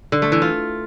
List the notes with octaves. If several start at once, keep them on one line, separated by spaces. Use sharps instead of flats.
D3
A3
E3
F4